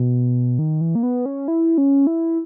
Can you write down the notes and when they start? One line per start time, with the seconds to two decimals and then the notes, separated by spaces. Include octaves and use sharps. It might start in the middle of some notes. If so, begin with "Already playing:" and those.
Already playing: B2
0.59 D#3
0.81 E3
0.95 A#3
1.03 B3
1.26 C#4
1.48 E4
1.78 C#4
2.07 E4